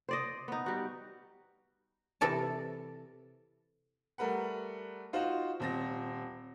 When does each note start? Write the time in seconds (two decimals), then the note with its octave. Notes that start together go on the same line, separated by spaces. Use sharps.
0.09 C5 D5 D#5
0.48 B3 D#4
0.66 G3 F#4
2.21 C3 E3 A4 D5 A5
4.18 G3 A3 A#4 B4 F#5
5.13 D#4 F4 F#4 C5
5.60 D#1 C4 A#6